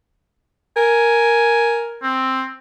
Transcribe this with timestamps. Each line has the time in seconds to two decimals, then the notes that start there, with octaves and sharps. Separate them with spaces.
0.77 A#4 G#5
2.03 C4